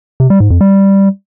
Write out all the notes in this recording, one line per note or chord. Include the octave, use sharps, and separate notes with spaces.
C3
G3
G#2
F2
G3